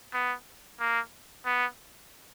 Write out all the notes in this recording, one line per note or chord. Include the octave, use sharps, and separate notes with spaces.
B3
A#3
B3